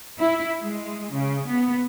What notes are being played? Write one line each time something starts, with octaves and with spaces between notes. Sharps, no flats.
E4
G#3
C#3
B3